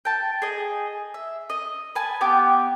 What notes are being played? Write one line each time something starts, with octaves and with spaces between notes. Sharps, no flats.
G5 A5
G#4 D#5
E5
D#5
B4 G#5 A5
B3 G4 G5 D6